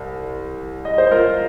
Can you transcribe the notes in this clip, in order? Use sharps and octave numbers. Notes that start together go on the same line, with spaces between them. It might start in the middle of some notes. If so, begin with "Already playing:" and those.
Already playing: C2
D#5
C5
F4 A#4